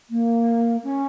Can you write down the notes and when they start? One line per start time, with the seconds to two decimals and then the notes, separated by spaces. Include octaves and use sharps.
0.10 A#3
0.83 C#4